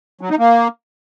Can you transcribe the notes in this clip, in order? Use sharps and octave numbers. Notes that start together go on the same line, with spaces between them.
F#3
D#4
A#3